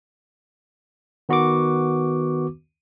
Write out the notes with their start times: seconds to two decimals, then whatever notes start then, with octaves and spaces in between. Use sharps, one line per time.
1.29 D#3 B3 F#4 B4 C#6 D6